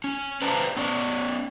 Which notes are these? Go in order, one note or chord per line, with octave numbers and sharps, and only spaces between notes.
C#4
B4 C5 D5 G5 A5 A#5
B3 C#4 D5